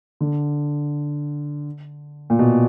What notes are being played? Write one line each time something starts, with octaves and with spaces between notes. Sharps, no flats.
D3
A#2
B2